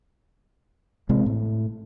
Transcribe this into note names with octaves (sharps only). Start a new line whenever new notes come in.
A1 C3 G#3 C4
A2